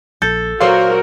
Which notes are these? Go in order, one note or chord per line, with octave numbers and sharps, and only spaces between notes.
A#1 A4 G6
A#2 F#3 A#3 F#4 A#4 C5 F5 C6